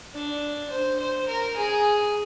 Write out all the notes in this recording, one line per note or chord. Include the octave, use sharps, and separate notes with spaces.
D4
C5
C5
A#4
G#4